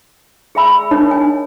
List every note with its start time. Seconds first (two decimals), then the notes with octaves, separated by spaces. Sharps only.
0.55 G#4 D5 E5 G#5 B5 E6
0.91 D4 D#4 A#4 C#5 D#5 D#6
1.11 D4 G#5